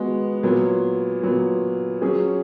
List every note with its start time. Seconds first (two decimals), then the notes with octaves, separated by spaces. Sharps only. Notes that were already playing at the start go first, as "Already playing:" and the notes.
Already playing: G#3 B3 F#4
0.43 A#2 F#3 B3
1.22 A#2 F#3 B3
2.02 F#3 C#4 G#4